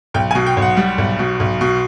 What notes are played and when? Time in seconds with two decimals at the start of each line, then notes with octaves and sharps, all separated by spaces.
0.14 B1 G5
0.31 G#5
0.35 B2
0.46 G5
0.57 B1
0.62 F#5
0.77 G3
0.98 B1
1.19 B2
1.40 B1
1.61 B2